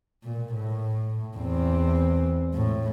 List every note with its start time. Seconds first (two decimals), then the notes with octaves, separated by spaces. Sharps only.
0.23 A#2
0.55 A2
1.37 E2 C4
2.54 A2